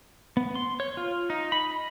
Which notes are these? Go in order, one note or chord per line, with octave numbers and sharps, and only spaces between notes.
B3
C6
C#5
F4
D#4
B5
D#5